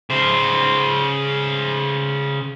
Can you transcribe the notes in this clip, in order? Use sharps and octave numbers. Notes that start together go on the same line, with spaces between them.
C#3 C5